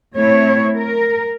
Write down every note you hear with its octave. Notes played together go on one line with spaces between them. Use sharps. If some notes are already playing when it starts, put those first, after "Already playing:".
A3 C4 E4 C#5
A#4